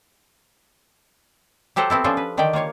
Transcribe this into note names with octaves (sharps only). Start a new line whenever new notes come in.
F#3 G4 A4 C5 F#5
B3 C4 E4 A4
F3 C#4 D4 F4 A4 C5
B4
D3 D#3 G4 D5 G5
A#3 F4 C#5 F5